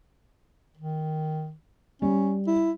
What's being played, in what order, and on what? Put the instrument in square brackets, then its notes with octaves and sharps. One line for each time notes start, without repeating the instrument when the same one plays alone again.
[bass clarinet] D#3
[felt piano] G3 [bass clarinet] C#4
[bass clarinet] E4